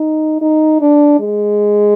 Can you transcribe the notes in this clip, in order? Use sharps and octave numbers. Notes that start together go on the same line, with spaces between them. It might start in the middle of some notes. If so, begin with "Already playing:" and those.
Already playing: D#4
D#4
D4
G#3